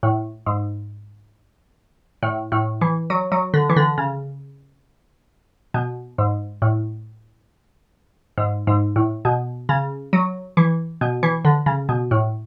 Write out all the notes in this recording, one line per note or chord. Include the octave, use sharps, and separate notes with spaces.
A2
G#2
A2
A2
E3
F#3
F#3
D3
E3
D3
C#3
B2
G#2
A2
G#2
G#2
A2
B2
C#3
F#3
E3
B2
E3
D3
C#3
B2
A2